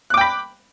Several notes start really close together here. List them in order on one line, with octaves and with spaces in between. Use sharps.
F#6 D6 G5 B5